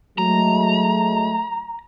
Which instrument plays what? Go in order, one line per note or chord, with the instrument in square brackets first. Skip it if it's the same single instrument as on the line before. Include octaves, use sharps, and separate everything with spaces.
[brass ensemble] F#3 G#3 A3 [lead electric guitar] A#5